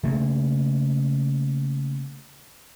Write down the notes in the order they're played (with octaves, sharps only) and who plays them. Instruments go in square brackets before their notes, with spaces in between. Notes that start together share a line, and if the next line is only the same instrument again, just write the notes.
[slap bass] C#3 A3 A#3